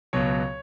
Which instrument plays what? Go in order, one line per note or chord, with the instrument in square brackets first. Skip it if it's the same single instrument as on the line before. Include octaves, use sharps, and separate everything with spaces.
[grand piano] C#2 B2 F#3 C#5